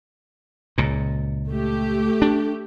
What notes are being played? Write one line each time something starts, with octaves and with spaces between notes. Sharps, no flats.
C#2 A#2
A3 G4
D4